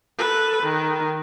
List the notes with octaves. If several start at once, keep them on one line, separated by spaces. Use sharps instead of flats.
A4 B4
D#3